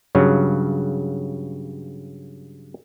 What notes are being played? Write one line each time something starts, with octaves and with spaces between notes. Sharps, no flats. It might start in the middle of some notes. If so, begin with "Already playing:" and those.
G2 C#3 F#3